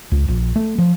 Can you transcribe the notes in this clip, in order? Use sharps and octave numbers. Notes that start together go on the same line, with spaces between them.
C#2
A#1
A3
F3